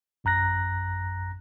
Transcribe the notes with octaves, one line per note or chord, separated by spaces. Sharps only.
A1 F#2 A#5 F#6 A#6